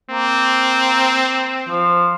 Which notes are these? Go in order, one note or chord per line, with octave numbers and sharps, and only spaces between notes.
A#3 C4
F3